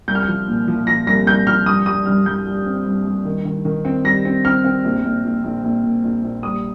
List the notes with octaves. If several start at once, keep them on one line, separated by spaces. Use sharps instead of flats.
C2 G6
F6
G6
F3
A#2
F3
F3 A#6
C2 A#6
C2 G6
F3 F6
G2 D#6
G3 D#6
G2 F6
G2 G6
G3
C4
G2
G2
D#3
D#3
D#3
C4
G3 A#6
C4
C4 F6
C4
A#1
A#1
A#1
A#1
A#1
A#2
A#1
A#1
G3 D#6